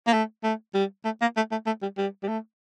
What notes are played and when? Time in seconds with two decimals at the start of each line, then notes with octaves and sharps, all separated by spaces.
0.07 A#3
0.13 A3
0.44 A3
0.74 G3
1.05 A3
1.21 A#3
1.37 A3
1.52 A3
1.66 A3
1.82 G3
1.98 G3
2.23 G3
2.28 A3